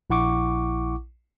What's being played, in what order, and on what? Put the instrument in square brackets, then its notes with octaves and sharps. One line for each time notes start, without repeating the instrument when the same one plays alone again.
[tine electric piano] A#1 E4 F#5 C#6 D6